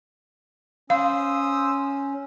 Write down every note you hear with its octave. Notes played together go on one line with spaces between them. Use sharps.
C#4 C5 F5 D#6 E6